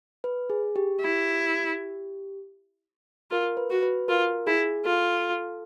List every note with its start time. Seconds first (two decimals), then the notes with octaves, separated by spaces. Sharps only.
0.24 B4
0.50 G#4
0.76 G4
1.01 E4
3.31 F4 A#4
3.57 B4
3.71 F#4
3.83 B4
4.08 F4 A#4
4.47 E4 G#4
4.85 F4 A4